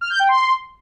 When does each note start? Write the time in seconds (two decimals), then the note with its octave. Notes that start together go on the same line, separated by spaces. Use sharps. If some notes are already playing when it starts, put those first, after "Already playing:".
0.01 F6
0.10 G6
0.19 G5
0.29 C6